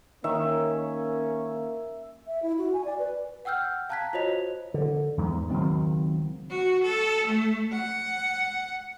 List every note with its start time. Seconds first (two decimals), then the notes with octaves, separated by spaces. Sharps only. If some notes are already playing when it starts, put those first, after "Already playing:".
0.24 D#3 A#3 C#4 E5
2.27 E5
2.43 E4
2.58 F#4
2.74 G#5
2.85 D5
2.99 B4
3.45 F#5 G5 E6 F6 G6
3.89 F5 A5 A#5 F#6 G#6 B6
4.13 F4 F#4 C5 C#5 D#5 F7
4.74 D3
5.17 E2 G#2
5.51 C#2 D#3 F#3 C4
6.50 F#4
6.83 A4
7.26 A3
7.72 F#5